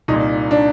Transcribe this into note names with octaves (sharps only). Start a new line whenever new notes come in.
C2 A#2 D#4
D4